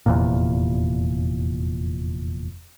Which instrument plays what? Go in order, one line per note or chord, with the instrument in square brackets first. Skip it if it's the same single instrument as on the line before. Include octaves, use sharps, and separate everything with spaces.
[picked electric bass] F1 E2 A#2